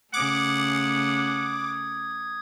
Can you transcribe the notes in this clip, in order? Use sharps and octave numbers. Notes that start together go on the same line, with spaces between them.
C#3 A3 F#5 D6 D#6 G#6